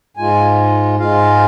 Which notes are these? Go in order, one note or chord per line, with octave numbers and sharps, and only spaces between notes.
G#2 G#3 F4 G#5
G#2 G#3 F4 F5